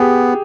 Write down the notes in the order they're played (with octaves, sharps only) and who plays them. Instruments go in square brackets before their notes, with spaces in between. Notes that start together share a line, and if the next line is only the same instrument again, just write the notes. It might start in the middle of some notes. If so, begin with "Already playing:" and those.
Already playing: [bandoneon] B3 [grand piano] G4 G#4